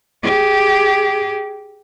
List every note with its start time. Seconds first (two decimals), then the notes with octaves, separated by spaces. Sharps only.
0.23 G4 G#4